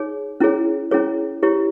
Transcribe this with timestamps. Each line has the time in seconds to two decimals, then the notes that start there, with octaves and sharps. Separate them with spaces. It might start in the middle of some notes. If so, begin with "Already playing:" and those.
Already playing: D#4 G#4 C#5
0.40 C#4 E4 G#4 C#5
0.91 C#4 E4 G#4 C#5
1.43 E4 G4 C#5